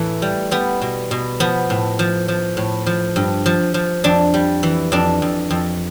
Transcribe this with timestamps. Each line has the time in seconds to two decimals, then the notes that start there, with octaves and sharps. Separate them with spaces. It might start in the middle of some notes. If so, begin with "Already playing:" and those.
Already playing: A2 E3 A3
0.22 G3
0.51 G3 B3
0.82 B2
1.11 B2
1.40 F3 B3
1.70 A2
1.99 F3
2.28 F3
2.57 A2
2.86 F3
3.16 G2
3.46 F3
3.74 F3
4.04 F2 D4
4.34 G3
4.63 E3
4.92 F2 D4
5.22 F2
5.51 F2